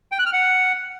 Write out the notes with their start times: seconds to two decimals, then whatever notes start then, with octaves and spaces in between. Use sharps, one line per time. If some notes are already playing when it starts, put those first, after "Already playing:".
0.12 G5
0.19 F#6
0.26 F6
0.33 F#5